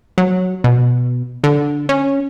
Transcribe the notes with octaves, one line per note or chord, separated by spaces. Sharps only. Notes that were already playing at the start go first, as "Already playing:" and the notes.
F#3
B2
D3
C#4